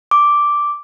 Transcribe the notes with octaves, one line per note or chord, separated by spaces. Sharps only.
D6